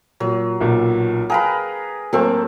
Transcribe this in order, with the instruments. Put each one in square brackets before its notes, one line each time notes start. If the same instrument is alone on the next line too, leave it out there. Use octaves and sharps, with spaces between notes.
[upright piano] A#2 [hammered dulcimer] F#3
[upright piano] B1 A#2
[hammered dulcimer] G#4 A#4 B4 [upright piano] F5 G5 A#5
[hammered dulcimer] A2 C4 A4 [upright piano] F#3 A#3